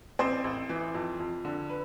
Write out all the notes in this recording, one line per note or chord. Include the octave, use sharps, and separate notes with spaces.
A1 C4 C5
A1
E3
F2
F2
D3
B4